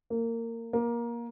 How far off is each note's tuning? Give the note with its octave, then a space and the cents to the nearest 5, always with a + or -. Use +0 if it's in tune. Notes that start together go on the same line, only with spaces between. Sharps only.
A#3 -20
A#3 +20